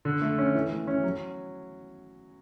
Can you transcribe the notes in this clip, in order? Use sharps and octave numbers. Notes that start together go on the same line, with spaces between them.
D3
A3
C#4
E3
A3
C#4
F#3